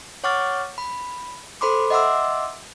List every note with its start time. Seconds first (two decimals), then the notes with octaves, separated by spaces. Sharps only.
0.24 C#5 F#5 C#6 D6 F6 A6
0.78 B5
1.61 A4 C5 B5 C6 D6
1.90 D#5 E5 F#5 C6 D6 E6